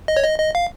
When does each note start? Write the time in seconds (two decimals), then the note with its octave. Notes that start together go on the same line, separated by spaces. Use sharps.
0.08 D#5
0.17 C#5
0.24 D#5
0.39 D#5
0.55 F5